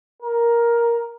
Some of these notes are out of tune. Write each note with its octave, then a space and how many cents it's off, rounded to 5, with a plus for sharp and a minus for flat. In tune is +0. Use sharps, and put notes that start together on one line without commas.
A#4 +5